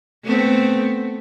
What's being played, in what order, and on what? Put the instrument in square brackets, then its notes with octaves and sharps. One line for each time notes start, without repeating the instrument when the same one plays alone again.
[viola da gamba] A3 B3 C4